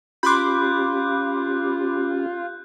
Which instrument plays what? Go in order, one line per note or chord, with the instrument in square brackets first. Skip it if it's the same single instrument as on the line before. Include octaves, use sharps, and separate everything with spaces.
[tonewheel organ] C#4 G4 [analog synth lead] F4 [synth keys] B5 C6 D6 [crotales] F#6 G6